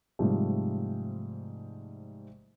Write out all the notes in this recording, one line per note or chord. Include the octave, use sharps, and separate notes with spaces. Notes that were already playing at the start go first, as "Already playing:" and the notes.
G#2 C3 F3 G3 A3